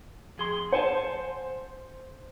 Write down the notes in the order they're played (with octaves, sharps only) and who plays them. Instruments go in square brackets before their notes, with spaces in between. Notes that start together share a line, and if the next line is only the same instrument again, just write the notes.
[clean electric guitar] F2 G#4 C6
[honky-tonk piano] C5 [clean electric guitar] F#5 G#5 A5